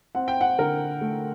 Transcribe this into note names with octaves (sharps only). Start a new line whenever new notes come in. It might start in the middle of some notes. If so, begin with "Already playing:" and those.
C4 F#5
G5
F#5
D3 A#4
A3